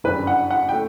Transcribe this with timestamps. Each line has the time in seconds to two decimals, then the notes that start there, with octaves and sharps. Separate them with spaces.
0.04 G1 F#2 D3 G3 B4
0.27 F#5
0.51 F#5
0.69 G5
0.73 A3